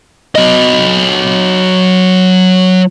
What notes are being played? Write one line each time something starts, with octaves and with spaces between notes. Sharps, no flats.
F#3 D#5